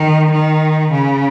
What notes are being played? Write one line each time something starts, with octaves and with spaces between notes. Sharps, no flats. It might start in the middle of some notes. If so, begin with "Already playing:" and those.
Already playing: D#3
D#3
C#3